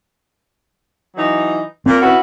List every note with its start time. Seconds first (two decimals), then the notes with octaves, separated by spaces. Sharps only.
1.15 E3 F#3 D#4
1.86 A#2 C4 A#4
2.01 C#4 E4 F#4 B4